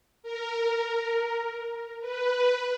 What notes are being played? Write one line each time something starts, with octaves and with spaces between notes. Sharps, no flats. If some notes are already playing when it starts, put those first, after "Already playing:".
A#4
B4